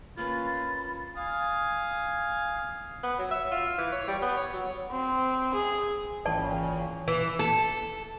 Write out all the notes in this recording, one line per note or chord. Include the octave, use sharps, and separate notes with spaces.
A#3 C#4 F4 B4 B5 A6
F5 G#5 D#6
B3
F#3
E5
F4
E3
C#5
G3
B3
C#5
F#3
C4
G#4
G#1 A#2 C#3 E3 C#4 D5 G5 A5
E3
A4